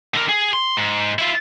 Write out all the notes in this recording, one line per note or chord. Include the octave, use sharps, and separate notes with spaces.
D3 A#4
G#4
C6
G#2
E4 F4